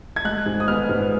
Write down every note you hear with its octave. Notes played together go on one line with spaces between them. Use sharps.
G#6
G#3 F#6
G#2
D#6
B3 F6
G#2